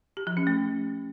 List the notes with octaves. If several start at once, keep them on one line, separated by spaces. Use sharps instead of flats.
G4
F3
C#4
A3